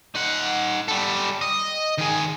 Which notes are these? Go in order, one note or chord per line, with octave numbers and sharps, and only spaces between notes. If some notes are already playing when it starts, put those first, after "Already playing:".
D#4 F#5
G3 A4
D#5
D#3 G#4